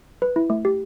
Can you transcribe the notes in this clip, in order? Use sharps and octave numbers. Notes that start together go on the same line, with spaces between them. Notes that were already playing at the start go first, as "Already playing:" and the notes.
B4
E4
A3
G4